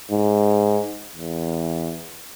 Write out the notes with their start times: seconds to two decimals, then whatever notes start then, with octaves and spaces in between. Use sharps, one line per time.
0.11 G#2
1.15 E2